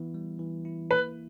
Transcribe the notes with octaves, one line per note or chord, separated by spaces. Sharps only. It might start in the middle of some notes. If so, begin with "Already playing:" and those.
Already playing: E3 B3 E4
G3
E3
E4
A#3 B4